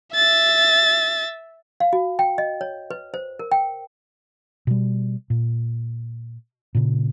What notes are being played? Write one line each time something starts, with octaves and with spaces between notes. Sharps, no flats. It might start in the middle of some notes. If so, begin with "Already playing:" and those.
E5 A6
F5
F#4
G5
D#5
C#5
B4
C5
A#4
G5
B2 G3
A#2
A#2 C#3